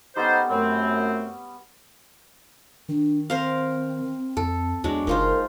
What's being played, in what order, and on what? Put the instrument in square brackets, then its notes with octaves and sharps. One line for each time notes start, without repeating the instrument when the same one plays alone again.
[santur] G3 B3 C#4 [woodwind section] D#4 A4 C5
[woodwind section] F#2 A3 C4
[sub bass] D#3 [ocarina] D4
[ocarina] C4 [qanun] A#4 C5 F5
[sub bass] F2 [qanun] A4
[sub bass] E2 [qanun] F#3 G#3 D4
[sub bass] F#1 [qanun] D#4 F4 C5 [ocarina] A#4